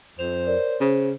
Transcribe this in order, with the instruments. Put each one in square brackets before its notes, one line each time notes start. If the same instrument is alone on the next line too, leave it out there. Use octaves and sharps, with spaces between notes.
[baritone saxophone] F2 [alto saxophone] C5 [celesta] F7
[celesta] A#4 C#5 D5
[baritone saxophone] C#3 [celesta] C5